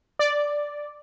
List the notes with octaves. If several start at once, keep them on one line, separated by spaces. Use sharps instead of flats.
D5